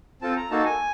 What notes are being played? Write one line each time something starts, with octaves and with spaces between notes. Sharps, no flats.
C4 F4 A4 A5
A#5
A#3 D#4 F#4 A4 A5
G#5